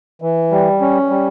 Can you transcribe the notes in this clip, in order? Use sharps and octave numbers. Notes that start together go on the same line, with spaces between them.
E3
G3
C#4
G3